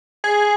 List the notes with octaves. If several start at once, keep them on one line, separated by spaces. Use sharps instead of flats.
G#4